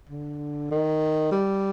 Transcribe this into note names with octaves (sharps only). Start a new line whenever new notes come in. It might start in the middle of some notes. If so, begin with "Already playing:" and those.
D3
D#3
G3